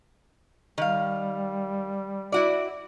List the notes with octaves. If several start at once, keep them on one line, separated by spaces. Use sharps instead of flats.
D#3 G3 F5
E4 F#4 D5